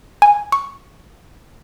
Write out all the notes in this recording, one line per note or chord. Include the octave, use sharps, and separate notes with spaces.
G#5
C#6